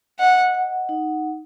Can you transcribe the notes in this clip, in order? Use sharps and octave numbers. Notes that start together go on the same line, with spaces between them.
D#5 F#5
F#5
D#4